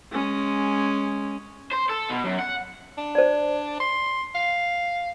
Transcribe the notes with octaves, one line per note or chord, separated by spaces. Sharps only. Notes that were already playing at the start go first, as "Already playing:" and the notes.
G#3 C#4
C5
A4
B2
F#2
F#5
D4
C5 D5
C6
F5